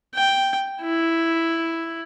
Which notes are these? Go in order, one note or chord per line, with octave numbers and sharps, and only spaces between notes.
G5
E4